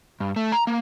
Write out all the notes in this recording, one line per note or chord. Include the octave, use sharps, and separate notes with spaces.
G2
A3
A#5
A#3